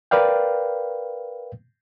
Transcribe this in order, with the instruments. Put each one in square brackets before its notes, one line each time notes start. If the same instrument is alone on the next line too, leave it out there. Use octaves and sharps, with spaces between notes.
[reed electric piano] A#4 B4 D5 F5 G5